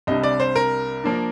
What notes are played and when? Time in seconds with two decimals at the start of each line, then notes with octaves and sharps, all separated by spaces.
0.07 C2 C3 G3 D4 D#5
0.23 D5
0.40 C5
0.56 A#4
1.04 F3 A#3 D4